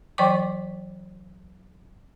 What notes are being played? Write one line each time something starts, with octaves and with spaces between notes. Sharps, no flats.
E3 F#3 D5 G5 C#6 D6